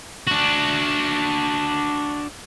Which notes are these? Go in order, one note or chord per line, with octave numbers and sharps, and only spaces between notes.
D4 F#4